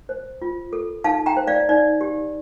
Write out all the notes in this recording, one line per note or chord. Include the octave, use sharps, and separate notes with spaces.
C5
F4
A4
D#4 F5 A5
G5 A#5
C5
D5 F5
D#4 D5
G4